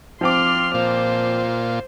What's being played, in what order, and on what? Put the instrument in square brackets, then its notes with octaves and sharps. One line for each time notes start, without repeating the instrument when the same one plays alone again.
[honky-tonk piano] F3 C4 D6 [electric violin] C6 F6
[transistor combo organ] A#2 F4 [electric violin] C5